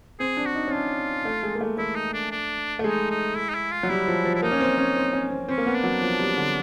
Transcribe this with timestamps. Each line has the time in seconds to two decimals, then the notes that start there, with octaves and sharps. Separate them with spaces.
0.19 C4 G#4
0.37 D4
0.46 F#4
0.55 D#4
0.68 C#4
0.73 D4 F4
1.25 A3
1.43 G#3
1.55 A#3
1.61 A3
1.78 A3 E4
1.95 D#4
2.13 D4
2.31 D4
2.79 A3
2.84 G#3 D#4
3.10 D#4
3.37 E4
3.49 D#4
3.54 E4
3.72 F4
3.83 F#3
3.89 G3 E4
4.07 F3
4.25 F3
4.35 E4
4.42 A#3 D#4
4.51 C#4
4.60 C4
4.78 C#4
4.96 C4
5.13 C#4
5.31 C4
5.48 C4 C#4
5.58 A#3
5.66 B3
5.75 D4
5.83 F#3
6.01 F3
6.19 G3
6.37 D3